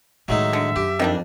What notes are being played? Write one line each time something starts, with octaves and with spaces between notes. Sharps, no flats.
A2 D#3 F#3 G#3 D#4 E5
D3
F#2 G4
F2 D#3 G3 D4